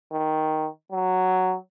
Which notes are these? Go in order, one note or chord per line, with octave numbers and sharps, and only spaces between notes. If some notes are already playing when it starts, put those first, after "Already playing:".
D#3
F#3